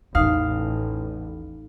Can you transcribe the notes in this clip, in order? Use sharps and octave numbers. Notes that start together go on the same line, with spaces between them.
A1 E2 D#4 F5